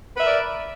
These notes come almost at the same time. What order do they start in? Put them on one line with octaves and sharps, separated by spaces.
B4 E5 A#4 D5